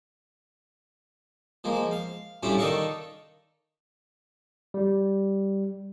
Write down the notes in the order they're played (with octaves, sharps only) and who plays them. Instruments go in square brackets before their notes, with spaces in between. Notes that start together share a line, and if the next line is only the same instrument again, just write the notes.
[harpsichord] F3 G#3 A#3
F5
A2 G3 C#4 D4 E4 F4
D#3 A4 D5 D#5 F5 C#6
[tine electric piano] G3